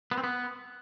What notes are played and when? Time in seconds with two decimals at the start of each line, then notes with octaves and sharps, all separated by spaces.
0.11 B3
0.18 C4
0.24 B3